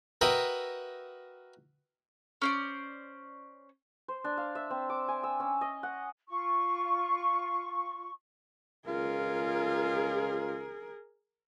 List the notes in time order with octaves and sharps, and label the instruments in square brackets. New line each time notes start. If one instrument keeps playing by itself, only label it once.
[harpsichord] F#4 A#4 B4 D#5 E5 G5
[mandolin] C#4 C5 D5
[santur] C5
D4
F5
E5
C4
D6
G#5
E6
C#4
D#5
F#5
[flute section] F4 C#6
[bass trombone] C#2 [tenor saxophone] F4 [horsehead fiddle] G#4 A#4